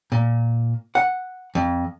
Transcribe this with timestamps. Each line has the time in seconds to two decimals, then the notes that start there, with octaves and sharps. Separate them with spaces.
0.12 A#2
0.95 F#5
1.55 F2